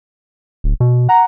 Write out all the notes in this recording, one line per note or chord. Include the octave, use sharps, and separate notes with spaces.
D1
B2
F#5 A#5